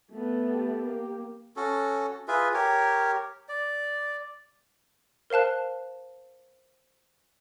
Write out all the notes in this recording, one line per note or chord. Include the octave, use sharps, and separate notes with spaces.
A3 B3
G4
A#3
C#4 F#4 A4
F4 G#4 B4 E5
G4 A#4 C#5
D5
A#4 C5 F5 A5 F#6